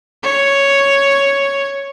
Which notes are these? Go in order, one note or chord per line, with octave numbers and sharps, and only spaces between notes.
C#5